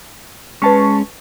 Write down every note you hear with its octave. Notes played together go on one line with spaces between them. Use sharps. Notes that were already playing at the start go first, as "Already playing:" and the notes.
G#3 C#4 B4 A5 C#6